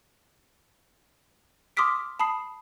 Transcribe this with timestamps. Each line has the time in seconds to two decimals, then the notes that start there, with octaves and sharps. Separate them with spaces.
1.77 C6 D6 D#6 F6 B6 D7
2.20 A5 B5 D#6 C7